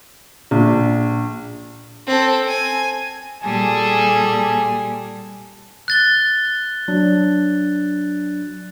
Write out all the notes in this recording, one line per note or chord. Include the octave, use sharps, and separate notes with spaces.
A#1
C4 A4
G#5
A#2 G3 G#4 A4 G#5
F#6 A6 G7
F#3 D4